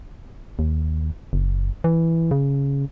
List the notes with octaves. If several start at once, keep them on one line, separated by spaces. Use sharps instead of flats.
D#2
F#1
E3
C#3